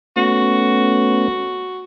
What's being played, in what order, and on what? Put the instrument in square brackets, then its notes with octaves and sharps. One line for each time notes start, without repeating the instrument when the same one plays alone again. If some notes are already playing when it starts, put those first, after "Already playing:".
[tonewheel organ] A3 B3 C#4 [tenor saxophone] F#4